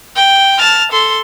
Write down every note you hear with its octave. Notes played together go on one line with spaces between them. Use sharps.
G5
A5 F6
A4 C6